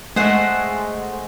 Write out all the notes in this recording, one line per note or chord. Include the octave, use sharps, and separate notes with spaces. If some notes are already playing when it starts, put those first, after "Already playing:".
G#3 A3 C5 F#5 D#6